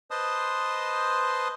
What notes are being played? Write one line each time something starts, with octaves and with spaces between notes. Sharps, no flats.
B4 C5 D#5 A5 C6 D#6